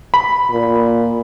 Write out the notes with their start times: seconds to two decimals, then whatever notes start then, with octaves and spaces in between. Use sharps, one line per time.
0.14 B5
0.51 A#2